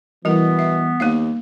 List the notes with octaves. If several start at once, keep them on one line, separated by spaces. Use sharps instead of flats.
B2 E3 G3 B3 A#4
E5
D#2 A#3 F5